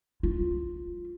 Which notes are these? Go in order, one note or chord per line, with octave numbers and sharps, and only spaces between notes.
F4